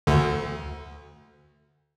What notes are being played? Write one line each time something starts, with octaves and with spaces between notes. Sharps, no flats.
D2 D3